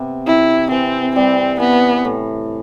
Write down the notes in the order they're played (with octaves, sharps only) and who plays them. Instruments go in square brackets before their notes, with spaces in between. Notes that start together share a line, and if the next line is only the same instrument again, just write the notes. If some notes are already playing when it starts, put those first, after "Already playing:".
Already playing: [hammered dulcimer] C3 B3
[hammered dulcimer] C3 [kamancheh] E4
[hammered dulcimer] E3 [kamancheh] C4
[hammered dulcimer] G3 [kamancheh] C4
[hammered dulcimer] E3 [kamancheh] B3
[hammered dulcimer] A2